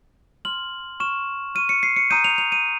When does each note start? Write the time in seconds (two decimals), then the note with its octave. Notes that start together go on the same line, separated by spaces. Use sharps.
0.45 C6 F6 F#7
1.00 C#6 F6 E7
1.55 C#6 F6 D#7
1.69 C#7
1.83 C7
1.96 C#7
2.10 A#5 D#6 G6 D#7
2.24 F7
2.38 F7
2.52 D#7